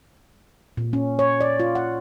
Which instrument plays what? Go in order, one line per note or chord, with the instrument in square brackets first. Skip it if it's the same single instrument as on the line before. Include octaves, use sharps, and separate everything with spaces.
[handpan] A#2
C#4
C#5
D5
F4
F#5